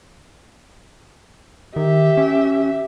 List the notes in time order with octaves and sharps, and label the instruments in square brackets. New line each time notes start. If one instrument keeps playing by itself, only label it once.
[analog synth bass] D#3 [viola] G4 E5
[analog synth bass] C#4